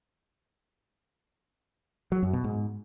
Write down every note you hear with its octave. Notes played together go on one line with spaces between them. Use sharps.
F#3
F#2
B2
G#2